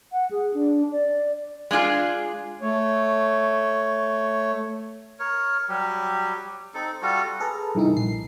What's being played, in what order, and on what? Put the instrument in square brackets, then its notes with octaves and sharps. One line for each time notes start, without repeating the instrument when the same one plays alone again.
[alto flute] F#5
G#4
D4
D5
[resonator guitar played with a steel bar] G#3 D4 F4 G#4
[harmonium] A3 C#5
[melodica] A#4 C#5
F#3 G3 G4
C4 D#4 A4
G3 F4 F#4 A4
[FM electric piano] G#4 A4 B4 A#5
G2 C3 D#3 E3 D#4
A#1 C7